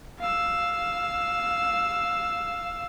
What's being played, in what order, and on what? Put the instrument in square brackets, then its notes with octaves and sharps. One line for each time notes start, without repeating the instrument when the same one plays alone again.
[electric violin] F5 E6